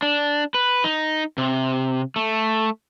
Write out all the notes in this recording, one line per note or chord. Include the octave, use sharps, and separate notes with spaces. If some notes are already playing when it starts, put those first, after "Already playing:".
D4
B4
D#4
C3
A3